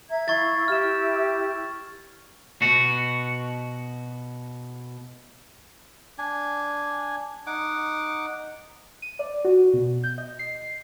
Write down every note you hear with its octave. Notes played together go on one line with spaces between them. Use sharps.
E5 A#5 G#6
E4 F5 C#6 G#6 A6
E4 G4 F6 E7
B2 F#4
D4 G#5
D#4 F#5 D6
D#7
D5
F#4
B2
G6
D#5
C7